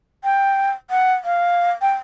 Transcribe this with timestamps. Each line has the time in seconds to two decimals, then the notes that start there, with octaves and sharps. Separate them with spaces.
0.24 G5
0.90 F#5
1.24 F5
1.81 G5